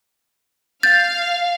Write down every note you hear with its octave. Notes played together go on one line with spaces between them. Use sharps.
F5 G6 A6